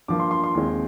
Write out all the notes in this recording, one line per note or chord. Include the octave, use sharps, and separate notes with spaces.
G2 F3 A#3 D6
C6
C6
C6
D#2 D#3 G#3 C4